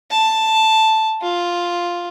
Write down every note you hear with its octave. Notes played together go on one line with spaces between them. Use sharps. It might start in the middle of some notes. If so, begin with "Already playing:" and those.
A5
F4